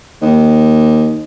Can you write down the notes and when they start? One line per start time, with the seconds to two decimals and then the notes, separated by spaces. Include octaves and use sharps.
0.22 D#2